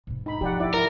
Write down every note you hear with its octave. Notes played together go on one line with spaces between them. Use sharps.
G#2 B2
D#4 B5
F3 G4 D5 F#5
E4 D5
A#4